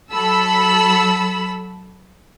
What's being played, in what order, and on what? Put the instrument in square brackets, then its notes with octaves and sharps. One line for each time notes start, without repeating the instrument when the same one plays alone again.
[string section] F#3 A4 B5 E6